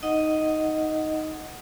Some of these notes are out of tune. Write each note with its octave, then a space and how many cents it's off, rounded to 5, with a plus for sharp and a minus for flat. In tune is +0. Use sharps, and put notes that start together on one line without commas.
D#4 +5 D#5 +0 F#5 +0